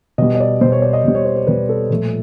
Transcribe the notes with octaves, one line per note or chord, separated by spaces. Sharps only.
B2 G3 D#5
D#5
D5
B2 G3 C5
C#5
D5
D#5
B2 G3
C#5
C5
C5
B2 G3 B4
A4
A#2 F3 A3